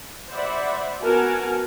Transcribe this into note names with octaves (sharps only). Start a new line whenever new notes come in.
C5 D5 E5 F#5 B5
B3 F#4 A#4 F#5 G#5 A5